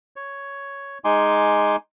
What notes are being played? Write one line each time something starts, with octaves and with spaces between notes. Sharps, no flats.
C#5
G#3 D#4 G#5 C6 D6